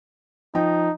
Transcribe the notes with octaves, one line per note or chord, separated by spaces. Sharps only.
F3 D#4 G5 A#5